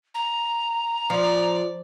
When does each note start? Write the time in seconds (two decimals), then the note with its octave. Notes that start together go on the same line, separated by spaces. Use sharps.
0.14 A#5
1.10 F3 D5